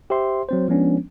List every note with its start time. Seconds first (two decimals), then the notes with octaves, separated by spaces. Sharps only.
0.10 G4 C5 E5 C6
0.49 F#3 C4 C5
0.68 F3 G#3 B3 C#4 D4